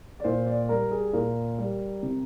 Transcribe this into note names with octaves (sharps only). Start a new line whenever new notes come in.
D5
A#2 C5
D5
G3 A#4
G#4
A#2 A#4
G3
C3